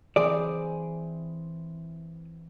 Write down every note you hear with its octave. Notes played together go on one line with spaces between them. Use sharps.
E3 C4 G#4 D5